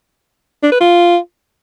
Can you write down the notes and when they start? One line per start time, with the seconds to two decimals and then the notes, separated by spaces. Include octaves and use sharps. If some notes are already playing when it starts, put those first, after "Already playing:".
0.63 D4
0.72 B4
0.81 F4